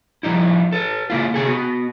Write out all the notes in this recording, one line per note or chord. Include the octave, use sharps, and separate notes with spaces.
F3 G3 D#4 E4
A4 B4
C#3 A#3 E4 F4
C3 G#4 A4
B3 F#4